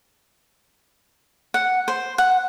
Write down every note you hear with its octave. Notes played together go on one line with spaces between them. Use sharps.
F#5
C5
F#5